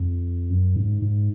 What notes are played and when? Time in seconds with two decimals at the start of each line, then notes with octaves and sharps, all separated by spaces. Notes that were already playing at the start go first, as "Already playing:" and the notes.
Already playing: F2
0.49 F#2
0.76 G#2
1.02 G#2